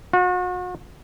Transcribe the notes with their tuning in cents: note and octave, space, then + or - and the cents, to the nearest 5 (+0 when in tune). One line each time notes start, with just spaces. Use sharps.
F#4 -40